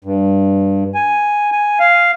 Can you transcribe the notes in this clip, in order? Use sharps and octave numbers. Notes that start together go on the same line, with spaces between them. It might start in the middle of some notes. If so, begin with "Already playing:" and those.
G2
G#5
G#5
F5